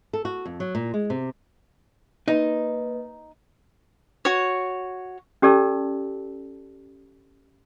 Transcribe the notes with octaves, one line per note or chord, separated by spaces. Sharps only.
A4
F#4
F2
F#3
A#2
G#3
C3
A#3 D#4 B4 D#5
F#4 C#5
C#4 G4 A4 D5 A5 E6